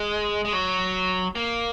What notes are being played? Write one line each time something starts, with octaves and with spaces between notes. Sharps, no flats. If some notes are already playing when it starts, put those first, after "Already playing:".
Already playing: G#3
G#3
F#3
A#3